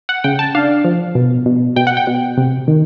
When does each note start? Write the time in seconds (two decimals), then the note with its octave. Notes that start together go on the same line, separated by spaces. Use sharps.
0.09 F#5
0.24 C#3 G5
0.39 A5
0.55 D4 F5
0.85 F3
1.15 B2
1.46 B2
1.76 B2 G5
1.87 F#5
1.97 G5
2.07 B2
2.37 C3
2.68 D#3